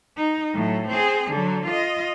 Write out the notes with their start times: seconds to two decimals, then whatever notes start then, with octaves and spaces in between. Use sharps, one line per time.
0.17 D#4
0.53 A2 F#3
0.89 C4 G#4
1.31 D3 F#3
1.66 F4 D#5